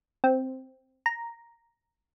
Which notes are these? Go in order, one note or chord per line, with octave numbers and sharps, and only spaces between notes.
C4
A#5